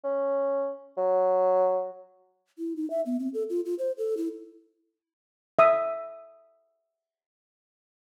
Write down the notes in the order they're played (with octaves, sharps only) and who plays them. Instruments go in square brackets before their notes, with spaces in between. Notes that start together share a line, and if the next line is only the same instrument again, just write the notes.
[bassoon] C#4
F#3
[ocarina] E4
D#4
E5
B3
C4
A4
F4
F4
C5
A4
E4
[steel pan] E5 D#6